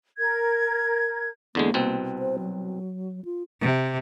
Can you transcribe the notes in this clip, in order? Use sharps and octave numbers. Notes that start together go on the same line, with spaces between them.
A#4 G#6
E2 D3 G#3 A#3
C2 B2 C4
C5
F#3
F4
C3